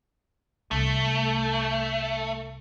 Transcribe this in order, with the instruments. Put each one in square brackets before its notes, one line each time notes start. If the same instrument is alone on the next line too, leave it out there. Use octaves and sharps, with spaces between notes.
[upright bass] C2 [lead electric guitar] A3